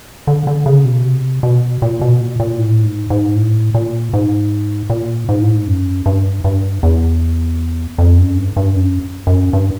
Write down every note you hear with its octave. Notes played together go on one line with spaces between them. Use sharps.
D3
D3
C#3
B2
C3
B2
A#2
B2
A#2
A#2
A2
G#2
G#2
A2
A#2
G#2
A#2
G#2
A2
G#2
F#2
G2
G2
E2
F2
F#2
G2
G2
F#2
F#2
G2